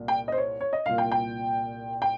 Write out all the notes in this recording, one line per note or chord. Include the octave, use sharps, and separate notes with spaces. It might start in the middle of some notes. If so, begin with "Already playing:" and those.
Already playing: C2 A#2
G5
D#5
C5
C#5
C#5
D#5
C2 A#2 F5
G5
G5
G5